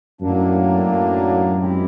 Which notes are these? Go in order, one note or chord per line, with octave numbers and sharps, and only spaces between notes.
F#2 A2 F#3 A#3 D4
F#2
D#3 G#3 C4 E4 G4